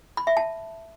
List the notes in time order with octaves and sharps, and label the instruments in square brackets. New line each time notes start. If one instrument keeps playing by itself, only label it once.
[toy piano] B5
E5
A5